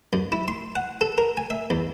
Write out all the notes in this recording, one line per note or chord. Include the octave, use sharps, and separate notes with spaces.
F#2
E4
C6
F#5
A4
A#4
G#5
E5
E2